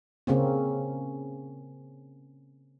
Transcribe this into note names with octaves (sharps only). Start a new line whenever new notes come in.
C#3 A#3 C4 C#4